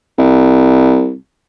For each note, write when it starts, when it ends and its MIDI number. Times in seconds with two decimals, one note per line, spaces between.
0.18 1.14 36